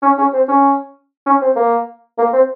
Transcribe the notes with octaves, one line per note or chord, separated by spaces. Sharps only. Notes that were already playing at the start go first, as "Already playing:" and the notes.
C#4
C#4
C4
C#4
C#4
C4
A#3
A#3
C4